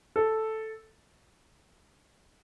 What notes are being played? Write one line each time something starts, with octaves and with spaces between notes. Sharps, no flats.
A4